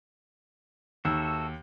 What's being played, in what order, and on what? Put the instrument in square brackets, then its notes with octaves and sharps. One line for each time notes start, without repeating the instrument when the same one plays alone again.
[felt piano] D#2 [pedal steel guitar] F#4 A4 E5